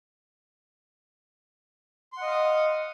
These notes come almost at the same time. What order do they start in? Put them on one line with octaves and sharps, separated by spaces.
C6 F#5 D#5 F5 D#6